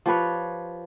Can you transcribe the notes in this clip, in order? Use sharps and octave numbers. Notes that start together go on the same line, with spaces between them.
F3 G4 B4 C#5